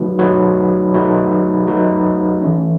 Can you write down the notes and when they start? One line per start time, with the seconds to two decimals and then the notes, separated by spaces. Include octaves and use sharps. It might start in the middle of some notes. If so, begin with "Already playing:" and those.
Already playing: F#3 A3 D#4 F#4 B4
0.19 F#3 A3 D#4 F#4 B4
0.93 F#3 A3 D#4 F#4 B4
1.67 F#3 A3 D#4 F#4 B4
2.41 E3 A3 C#4